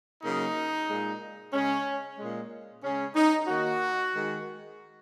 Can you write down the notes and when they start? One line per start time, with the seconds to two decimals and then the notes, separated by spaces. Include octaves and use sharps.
0.22 C#3 F#3 A#3 D#4
0.88 A#2 G#3
1.53 C#3 G#3 C#4
2.18 A#2 G#3
2.83 C#3 G#3 C#4
3.15 D#4
3.47 D#3 A#3 F#4
4.13 D#3 G#3